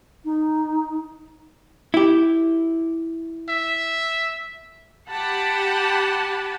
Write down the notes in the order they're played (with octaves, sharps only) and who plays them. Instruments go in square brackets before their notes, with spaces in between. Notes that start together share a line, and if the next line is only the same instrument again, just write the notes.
[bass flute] D#4
[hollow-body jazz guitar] E4 G4
[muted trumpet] E5
[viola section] G4 F#5 A5 B5